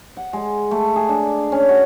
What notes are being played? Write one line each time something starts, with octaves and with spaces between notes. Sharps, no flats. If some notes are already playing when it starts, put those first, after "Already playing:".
F#5
G#3
A3
G#4
D4
C#4
F#4